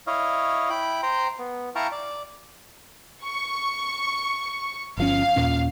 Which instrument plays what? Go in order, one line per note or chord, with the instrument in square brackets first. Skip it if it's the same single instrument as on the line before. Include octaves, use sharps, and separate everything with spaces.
[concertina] E4 C#5 D#5 F5
E4 G5 B5
C5 G5 A#5 C6
B3
E4 F5 G5 A5 A#5 C#6
D5
[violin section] C#6
[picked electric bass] G1 F3 C#4 [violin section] F5
[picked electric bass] D#2 A#2 C#4